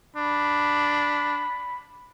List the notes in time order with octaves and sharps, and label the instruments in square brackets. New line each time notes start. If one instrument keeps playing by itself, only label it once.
[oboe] D4 [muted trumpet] B5